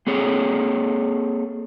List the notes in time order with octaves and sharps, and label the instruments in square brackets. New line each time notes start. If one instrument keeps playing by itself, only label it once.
[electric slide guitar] A#3 C4 G#4 A4 C#5